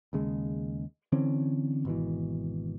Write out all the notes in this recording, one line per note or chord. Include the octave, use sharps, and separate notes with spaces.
D#2 C#3 G#3
D3 E3 C4 C#4
G#1 B2 E3